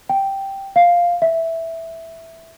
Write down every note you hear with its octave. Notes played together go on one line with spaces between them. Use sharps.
G5
F5
E5